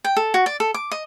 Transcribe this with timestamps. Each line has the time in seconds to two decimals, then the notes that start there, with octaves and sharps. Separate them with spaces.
0.04 G5
0.17 A4
0.34 F#4
0.46 D5
0.60 A4
0.74 D6
0.91 D#5